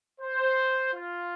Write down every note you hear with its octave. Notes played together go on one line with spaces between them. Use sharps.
C5
F4